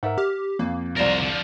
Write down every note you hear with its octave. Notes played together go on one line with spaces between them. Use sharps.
G#2 A#4 E5 F#5
G4 F6
F2 A#3
C2 F2 A#4 C5 D5
D3 F3